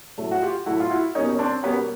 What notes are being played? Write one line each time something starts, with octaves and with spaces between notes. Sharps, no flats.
A2 F#3 A3
F#4
F4 G4
A2 F#3 A3 E4 F#4
F4
E4 F#4
B2 G3 A#3 C#4 D#4
C#4
C4 D4
B2 G3 A#3 B3 C#4